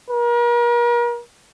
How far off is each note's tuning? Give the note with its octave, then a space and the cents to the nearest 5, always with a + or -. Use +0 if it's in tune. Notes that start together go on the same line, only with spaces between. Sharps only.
A#4 +40